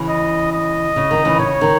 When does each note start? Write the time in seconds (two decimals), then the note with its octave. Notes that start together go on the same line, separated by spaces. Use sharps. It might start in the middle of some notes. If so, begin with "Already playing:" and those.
Already playing: C#3 E3
0.09 D#5
0.52 D#5
0.96 C#3
1.11 D#3
1.25 C#3 E3
1.39 C#3 C#5
1.61 D#3